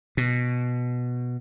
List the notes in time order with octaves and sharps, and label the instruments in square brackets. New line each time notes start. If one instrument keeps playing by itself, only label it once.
[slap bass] B2